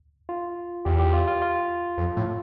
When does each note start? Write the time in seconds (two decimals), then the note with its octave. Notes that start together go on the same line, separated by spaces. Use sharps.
0.29 F4
0.85 E2 G4
0.99 G4
1.13 F4
1.27 F4
1.42 F4
1.98 F2
2.17 A2